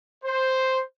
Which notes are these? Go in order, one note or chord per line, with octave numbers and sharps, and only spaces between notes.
C5